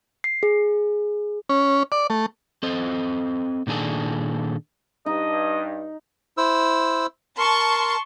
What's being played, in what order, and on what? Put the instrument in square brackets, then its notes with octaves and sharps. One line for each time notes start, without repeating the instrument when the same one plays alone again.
[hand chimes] C7
G#4
[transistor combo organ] C#4
D5
A3
[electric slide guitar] C4 A4 C5 D#5
A#2 D#3 D4 G#4 A4
[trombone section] G2 [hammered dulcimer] D#4 [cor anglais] D#5
[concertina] E4 C5 E6
[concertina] A#4 [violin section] A5 C6 C#6